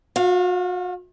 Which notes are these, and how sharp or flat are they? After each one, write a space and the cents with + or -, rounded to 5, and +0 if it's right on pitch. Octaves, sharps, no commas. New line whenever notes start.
F#4 -40 F5 +0